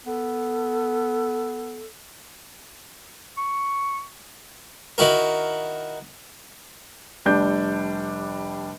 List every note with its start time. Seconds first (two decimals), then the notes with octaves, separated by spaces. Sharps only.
0.06 B3 A4
3.37 C#6
4.98 D#3 E4 F#4 A#4
7.25 F1 G3 D4 G6